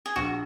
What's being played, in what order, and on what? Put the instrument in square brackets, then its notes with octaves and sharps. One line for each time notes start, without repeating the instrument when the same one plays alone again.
[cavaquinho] G#4
[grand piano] A#1 [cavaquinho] F#4